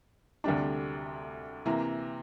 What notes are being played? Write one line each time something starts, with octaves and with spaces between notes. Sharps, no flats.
D2 C3 G3 D4
C3 E3 A#3